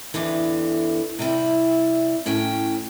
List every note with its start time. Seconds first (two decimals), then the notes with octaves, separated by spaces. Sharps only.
0.14 E2 G2 D3 E3
1.19 C3 G3 E4
2.26 A2 C#4 G5